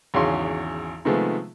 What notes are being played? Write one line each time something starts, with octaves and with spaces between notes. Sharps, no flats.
G#1 E2 C#3 F#4 C#5 C6
C3 D#3 F3 G#3 A3 B3